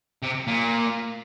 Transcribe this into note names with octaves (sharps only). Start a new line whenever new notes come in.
C3
A#2